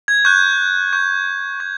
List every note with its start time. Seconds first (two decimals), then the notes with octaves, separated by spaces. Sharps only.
0.08 G#6
0.25 C#6 F#6 G6
0.93 C#6 F#6 G6
1.60 C#6 G#6